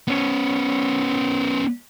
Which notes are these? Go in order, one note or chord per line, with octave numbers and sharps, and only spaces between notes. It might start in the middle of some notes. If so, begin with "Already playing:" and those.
B3 C#4